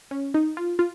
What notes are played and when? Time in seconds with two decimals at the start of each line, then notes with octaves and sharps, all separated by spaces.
0.11 C#4
0.34 D#4
0.57 F4
0.79 F4